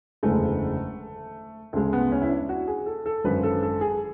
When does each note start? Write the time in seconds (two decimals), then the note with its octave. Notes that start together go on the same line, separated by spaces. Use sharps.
0.23 F#1 E2 D3 G#3 A3
1.73 D2 C#3 G#3 A3
1.93 B3
2.12 C#4
2.22 E4
2.30 D4
2.49 F#4
2.68 G#4
2.86 A4
3.06 A4
3.24 G#1 F#2 D3 B4
3.43 A4
3.62 A4
3.81 G#4